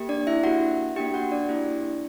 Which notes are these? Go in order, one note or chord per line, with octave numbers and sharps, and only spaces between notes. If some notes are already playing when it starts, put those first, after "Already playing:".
Already playing: A#3 G4
D4 D5
E4 E5
A#3 D4 F#4 G4 F#5
A#3 D4 G4 G5
F#4 F#5
D4 D5
A#3 E4 G4